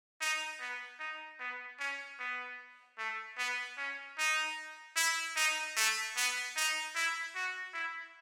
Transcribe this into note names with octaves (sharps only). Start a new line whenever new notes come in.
D#4
B3
D#4
B3
C#4
B3
A3
B3
C#4
D#4
E4
D#4
A3
B3
D#4
E4
F#4
E4